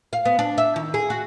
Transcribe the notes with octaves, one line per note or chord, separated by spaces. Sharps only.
F5
B3
D4
E5
D#3
G#4
F#4